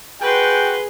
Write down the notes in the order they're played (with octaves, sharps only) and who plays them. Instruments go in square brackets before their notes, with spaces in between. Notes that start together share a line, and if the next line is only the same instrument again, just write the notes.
[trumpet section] F#4 F#5 G5 [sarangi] G#4 [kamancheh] B4 C6